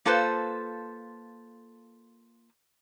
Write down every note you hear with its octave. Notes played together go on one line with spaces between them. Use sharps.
A#3 F4 A4 B4 C5